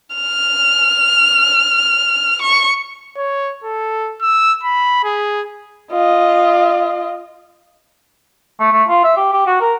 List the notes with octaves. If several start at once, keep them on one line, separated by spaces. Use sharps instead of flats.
F6
C#6
C#5
A4
E6
B5
G#4
F4 D#5
A3
A3
F4
E5
G4
G4
F#4
A#4